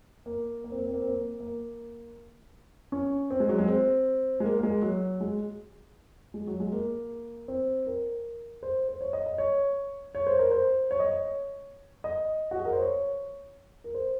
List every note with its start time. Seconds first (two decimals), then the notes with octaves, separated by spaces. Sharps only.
0.26 A#3
0.64 A#3
0.72 C4
0.79 A#3
0.87 C4
0.94 A#3
1.02 C4
1.09 A#3
1.40 A#3
2.92 C#4
3.31 C4
3.40 G#3
3.49 F#3
3.58 G#3
3.68 C4
4.40 G#3
4.44 A#3
4.59 A#3
4.63 G#3
4.82 F#3
5.21 G#3
6.34 G#3
6.47 F#3
6.60 G#3
6.72 A#3
7.48 C4
7.86 A#4
8.63 C5
8.89 C5
9.01 C#5
9.13 D#5
9.26 D#5
9.38 C#5
10.15 C#5
10.27 C5
10.39 A#4
10.51 C5
10.91 C#5
10.99 D#5
11.09 C#5
12.04 D#5
12.51 F#4
12.58 G#4
12.65 A#4
12.73 C5
12.81 C#5
13.84 A#4
13.94 C5